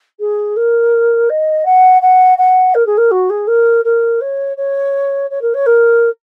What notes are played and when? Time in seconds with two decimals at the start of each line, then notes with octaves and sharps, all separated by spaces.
0.19 G#4
0.56 A#4
1.29 D#5
1.65 F#5
2.02 F#5
2.38 F#5
2.74 A#4
2.86 G#4
2.97 A#4
3.11 F#4
3.30 G#4
3.47 A#4
3.84 A#4
4.21 C#5
4.57 C#5
5.30 C#5
5.41 A#4
5.54 C#5
5.66 A#4